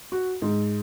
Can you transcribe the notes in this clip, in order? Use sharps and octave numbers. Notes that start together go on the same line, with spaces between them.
F#4
G#2